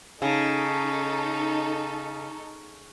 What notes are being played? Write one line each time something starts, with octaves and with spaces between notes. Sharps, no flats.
C#3 D#4 A4